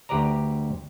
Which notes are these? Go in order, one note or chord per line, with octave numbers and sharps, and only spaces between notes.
D2 G4 B4 D5 A#5